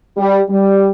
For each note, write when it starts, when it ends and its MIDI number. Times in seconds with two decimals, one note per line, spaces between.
0.17 0.40 55
0.49 0.91 55